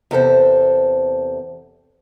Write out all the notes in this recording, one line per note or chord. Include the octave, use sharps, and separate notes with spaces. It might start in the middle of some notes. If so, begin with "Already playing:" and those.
E2 C3 A4 C5